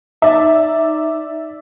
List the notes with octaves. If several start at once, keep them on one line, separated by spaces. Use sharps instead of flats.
D#4 D5 E5